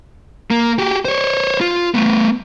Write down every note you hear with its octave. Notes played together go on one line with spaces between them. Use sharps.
A#3
F#4 G4
C5 C#5
F4
A3 B3